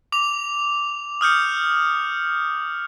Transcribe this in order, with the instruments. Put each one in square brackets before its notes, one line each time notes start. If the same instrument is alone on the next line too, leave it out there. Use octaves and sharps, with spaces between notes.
[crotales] D6 F7
D#6 F6 G6 C#7